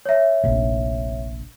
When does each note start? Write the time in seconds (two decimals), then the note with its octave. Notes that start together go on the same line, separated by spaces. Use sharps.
0.05 C#5 E5
0.43 F1 A#1